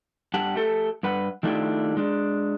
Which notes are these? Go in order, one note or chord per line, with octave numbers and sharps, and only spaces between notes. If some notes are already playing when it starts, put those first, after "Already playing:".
G2 G4 F#5 A5
A3 G4 A4
G2 B4 F#5
D#3 A3 D4 E4 F4 G4
G#3 D4